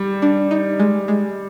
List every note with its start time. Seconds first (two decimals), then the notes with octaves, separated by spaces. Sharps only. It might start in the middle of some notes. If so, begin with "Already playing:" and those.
Already playing: G3
0.22 D4
0.51 D#4
0.80 G#3
1.08 G#3